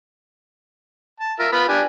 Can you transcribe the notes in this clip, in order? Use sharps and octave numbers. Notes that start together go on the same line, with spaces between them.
A5
F4 A#4 E5
B3 F4 B5
D4 G4 G#5